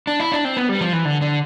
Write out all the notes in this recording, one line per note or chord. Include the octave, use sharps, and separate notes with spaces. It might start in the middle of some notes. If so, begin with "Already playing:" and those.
D4
E4
D4
C4
B3
G3
F3
E3
D3
D3